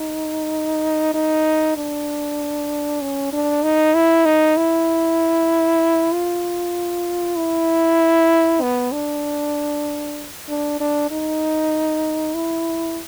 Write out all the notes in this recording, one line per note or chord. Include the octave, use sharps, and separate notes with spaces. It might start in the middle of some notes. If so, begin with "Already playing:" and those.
Already playing: D#4
D#4
D4
C#4
D4
D#4
E4
D#4
E4
F4
E4
B3
D4
D4
D4
D#4
E4